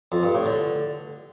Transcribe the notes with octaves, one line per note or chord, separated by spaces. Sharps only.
F2
G2
A2
D3